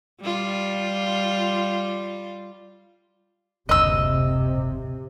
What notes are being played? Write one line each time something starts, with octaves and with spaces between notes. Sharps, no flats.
G3 F4
F#1 D2 G#2 C3 D#5 E6